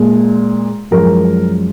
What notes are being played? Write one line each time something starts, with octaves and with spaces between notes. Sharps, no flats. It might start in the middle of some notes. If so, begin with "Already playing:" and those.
Already playing: A#2 G#3
F#2 F3 G#3 A#4